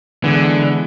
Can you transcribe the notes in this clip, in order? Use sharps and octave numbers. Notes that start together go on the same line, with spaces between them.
D3 E3 G#3 B3